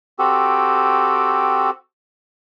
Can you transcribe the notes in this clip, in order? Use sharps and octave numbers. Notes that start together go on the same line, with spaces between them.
C4 F#4 G4 A4